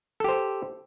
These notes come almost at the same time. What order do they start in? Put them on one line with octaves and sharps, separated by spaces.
A4 G4 C5